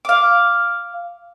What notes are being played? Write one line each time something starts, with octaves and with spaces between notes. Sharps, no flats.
F5 D6